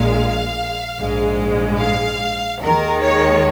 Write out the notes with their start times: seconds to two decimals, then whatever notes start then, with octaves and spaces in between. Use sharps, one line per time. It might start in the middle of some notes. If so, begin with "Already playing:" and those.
Already playing: A#1 A#2 G#3 F5
0.99 A#1 G#2 G#3
1.80 F5
2.62 D#2 D#3 G#3 A#4
3.03 C#5